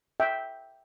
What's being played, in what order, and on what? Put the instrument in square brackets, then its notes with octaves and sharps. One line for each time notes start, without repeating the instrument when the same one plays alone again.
[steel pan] E5 G5